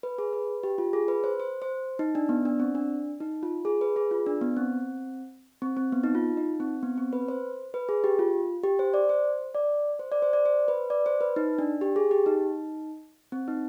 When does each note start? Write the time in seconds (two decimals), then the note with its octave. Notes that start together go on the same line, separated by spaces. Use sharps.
0.03 B4
0.18 G#4
0.33 B4
0.63 G4
0.78 F4
0.93 G#4
1.08 B4
1.24 C5
1.40 C5
1.62 C5
1.99 D#4
2.15 D4
2.29 B3
2.45 D4
2.60 C4
2.75 D4
3.20 D#4
3.43 F4
3.65 G#4
3.81 B4
3.96 G#4
4.11 F4
4.26 D4
4.41 B3
4.57 C4
5.62 C4
5.77 C4
5.92 B3
6.03 D#4
6.15 F4
6.37 D#4
6.60 C4
6.83 B3
6.98 C4
7.13 B4
7.28 C5
7.74 B4
7.89 G#4
8.04 G4
8.19 F4
8.64 G4
8.79 C5
8.94 D5
9.09 C5
9.55 D5
9.99 C5
10.12 D5
10.22 C5
10.33 D5
10.45 C5
10.68 B4
10.90 D5
11.06 C5
11.21 B4
11.36 D#4
11.59 D4
11.81 G4
11.96 G#4
12.11 G4
12.26 D#4
13.32 C4
13.48 D#4